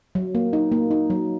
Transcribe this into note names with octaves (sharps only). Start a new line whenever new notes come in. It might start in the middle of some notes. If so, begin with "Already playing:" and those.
F#3
A#3
D#4
A#3
D#4
F#3